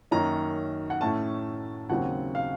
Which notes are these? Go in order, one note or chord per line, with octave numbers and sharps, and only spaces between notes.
F#2 D#3 A#3 C#4 A#5
F#5
A2 A3 C#4 A5
D#2 C#3 F#3 C4 F#5
F5